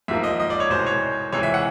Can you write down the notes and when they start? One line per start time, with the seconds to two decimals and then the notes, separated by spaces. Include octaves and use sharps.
0.08 G#2 F3 A#3 E5
0.24 D#5
0.40 D#5
0.50 D5
0.60 C#5
0.70 C2 B2 G#3 C5
0.86 C#5
1.32 C#2 C3 E3 G#3 C#5
1.43 E5
1.54 F#5